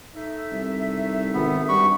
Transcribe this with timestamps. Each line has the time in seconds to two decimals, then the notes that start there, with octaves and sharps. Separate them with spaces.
0.16 A3 D#4 E5
0.51 C2
1.34 G#1 B3
1.69 G2 F#4 B5 C#6